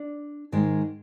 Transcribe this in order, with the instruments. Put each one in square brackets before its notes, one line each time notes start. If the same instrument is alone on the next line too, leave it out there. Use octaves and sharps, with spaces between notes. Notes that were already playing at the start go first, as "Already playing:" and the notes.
Already playing: [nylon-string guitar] D4
G#2 D#3 G#3